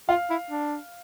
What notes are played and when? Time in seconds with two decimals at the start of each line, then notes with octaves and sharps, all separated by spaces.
0.09 F4 F5
0.30 E4
0.51 D4